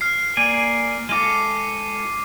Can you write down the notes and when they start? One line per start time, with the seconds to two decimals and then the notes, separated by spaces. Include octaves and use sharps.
0.01 F6 C7
0.37 A#3 D5 G#5
1.09 G#3 F4 A4 D6 D#7